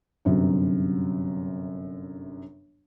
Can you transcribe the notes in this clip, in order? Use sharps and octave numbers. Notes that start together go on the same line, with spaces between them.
G1 F#2 C3 F#3